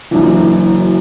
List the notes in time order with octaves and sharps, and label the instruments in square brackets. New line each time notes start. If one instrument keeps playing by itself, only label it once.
[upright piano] F#1 F#2 E3 D4